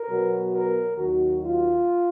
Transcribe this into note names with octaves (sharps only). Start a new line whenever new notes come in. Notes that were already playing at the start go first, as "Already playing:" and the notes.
Already playing: A#4
B2 F#3 B3
A#4
D#2 D#3 F#3 F#4
F4